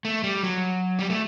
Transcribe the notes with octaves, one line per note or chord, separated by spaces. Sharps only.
A3
G3
F#3
G3
A3